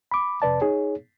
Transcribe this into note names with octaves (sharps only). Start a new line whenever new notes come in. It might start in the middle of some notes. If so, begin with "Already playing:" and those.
B5 D6
F2 C3 B4 D5 A5
D#4 G#4 C#5